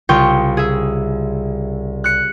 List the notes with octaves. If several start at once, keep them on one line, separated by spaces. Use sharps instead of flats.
C2 C#3 F4 G5 C#6 G6
G#4 E5
F#6 C#7